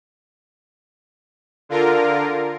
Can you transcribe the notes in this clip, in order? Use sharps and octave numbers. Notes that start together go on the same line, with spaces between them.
D3 F4 A#4